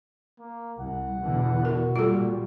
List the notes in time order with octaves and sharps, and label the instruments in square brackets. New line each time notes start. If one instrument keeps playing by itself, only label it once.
[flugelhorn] A#3
[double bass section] C2 [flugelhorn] F#5
[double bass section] E2 B2 D3
[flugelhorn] F#4 [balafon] A#4
[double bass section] A#2 G3 [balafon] F4 A4